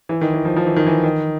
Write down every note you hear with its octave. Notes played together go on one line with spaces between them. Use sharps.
E3
D#3
E3
F3
F3
E3
D#3
E3
D#3